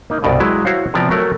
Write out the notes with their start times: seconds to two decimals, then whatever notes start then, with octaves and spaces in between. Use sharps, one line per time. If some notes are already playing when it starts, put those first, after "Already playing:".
0.10 A#3 D#4
0.22 C2 G2 B2 D5 D#5
0.40 F#3 G#3 E4
0.65 E4 F#4 C5 C#5 F5
0.94 C3 F3 B3 D5 A#5
1.10 F#3 A3 A#4 C#5 F#5